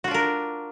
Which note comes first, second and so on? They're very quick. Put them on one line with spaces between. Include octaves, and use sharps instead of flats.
F#4 F4 D4 A#4